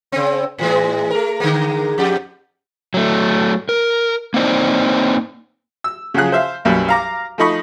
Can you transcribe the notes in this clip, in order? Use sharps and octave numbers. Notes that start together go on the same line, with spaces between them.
C#3 C4
A2 E3 G#3
A3 A#4
D3 G#3 A#3
F2 G4
F#3 A3
A#4
A#3 C4 D#4 C5 D5
E6
C#3 F3 F#3 G#4 F#6
C5 E5 F5
B1 F#2 G3 G4 B4
F5 A#5 D6
F3 A3 D#4 B5 C#6